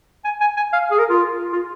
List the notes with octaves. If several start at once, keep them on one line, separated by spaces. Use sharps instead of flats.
G#5
G#5
G#5
F5
G#4
A#4
F4
F4